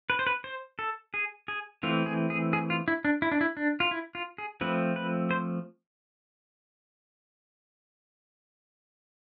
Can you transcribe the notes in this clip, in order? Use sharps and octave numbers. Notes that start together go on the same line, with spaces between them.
B4
C5
B4
C5
A4
G#4
G#4
E3 A3 C4 F4
G#4
G#4
G#4
F4
E4
D4
E4
D4
E4
D4
F4
E4
F4
G#4
F3 A3 C4 B4
B4
C5